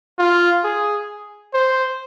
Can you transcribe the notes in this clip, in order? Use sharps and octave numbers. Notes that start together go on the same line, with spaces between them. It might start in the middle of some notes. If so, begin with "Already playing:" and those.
F4
G#4
C5